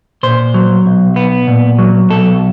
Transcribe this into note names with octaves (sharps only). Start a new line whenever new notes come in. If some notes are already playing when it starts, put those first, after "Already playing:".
A#2 C5
F#3
B1
B3
A#2
F#3
B1 A4